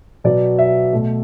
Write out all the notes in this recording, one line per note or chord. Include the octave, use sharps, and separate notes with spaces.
B2 F#3 B3 D5
E5
B2 A3